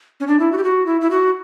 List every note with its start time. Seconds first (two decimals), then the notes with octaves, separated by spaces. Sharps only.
0.20 C#4
0.28 D4
0.39 E4
0.52 F#4
0.58 G4
0.64 F#4
0.86 E4
1.01 E4
1.11 F#4